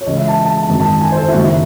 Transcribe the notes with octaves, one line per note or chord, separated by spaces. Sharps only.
C#5
C#2 C#3 E3 D#5
E5
A5
A5
A5
G#1 F#2 D#3
A5
G#5
C5
A4
E4
F#1 F#2 D#3 F#4
E4